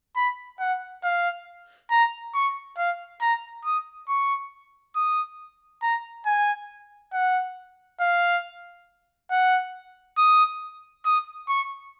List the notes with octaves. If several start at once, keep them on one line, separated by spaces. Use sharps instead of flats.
B5
F#5
F5
A#5
C#6
F5
A#5
D#6
C#6
D#6
A#5
G#5
F#5
F5
F#5
D#6
D#6
C#6